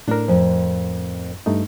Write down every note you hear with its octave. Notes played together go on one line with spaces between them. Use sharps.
A2 D4 A#4
F2
G2 A3 D#4